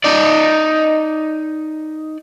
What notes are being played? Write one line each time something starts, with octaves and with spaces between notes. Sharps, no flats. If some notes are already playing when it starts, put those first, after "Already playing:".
D#4 D5